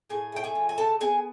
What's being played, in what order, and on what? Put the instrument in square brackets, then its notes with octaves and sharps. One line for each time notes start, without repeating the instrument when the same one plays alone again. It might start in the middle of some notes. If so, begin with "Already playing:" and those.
[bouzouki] A2 G#4 G#5
A3 G5
G#4 G#5
F3
G#5
C#3 A4 A5
B3 G#4 G#5